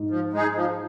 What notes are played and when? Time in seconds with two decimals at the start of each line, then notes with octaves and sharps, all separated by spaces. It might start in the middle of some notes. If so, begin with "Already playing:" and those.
Already playing: G#2
0.10 F3
0.33 G#3 D#4 G#4
0.55 F3